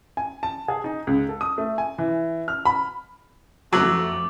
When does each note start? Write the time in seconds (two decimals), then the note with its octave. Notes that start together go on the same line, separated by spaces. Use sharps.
0.17 G#5
0.43 A5
0.68 G#4
0.84 D#4
1.07 C#2
1.29 A4
1.41 D#6
1.58 A3
1.78 G#5
1.98 E3
2.48 F6
2.65 B5
3.73 F2 F#3 A3 D6 E6 A6 F#7